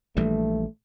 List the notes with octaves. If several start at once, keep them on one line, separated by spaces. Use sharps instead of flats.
A#1 E3 G3 A3